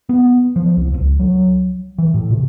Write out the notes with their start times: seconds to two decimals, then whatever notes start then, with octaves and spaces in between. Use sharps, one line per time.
0.09 B3
0.56 F3
0.77 C2
0.94 C#2
1.20 F#3
1.98 E3
2.14 A2
2.31 C3